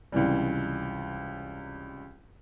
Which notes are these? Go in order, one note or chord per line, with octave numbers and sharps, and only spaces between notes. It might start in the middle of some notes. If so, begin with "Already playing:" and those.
C#2 C3 E3 G3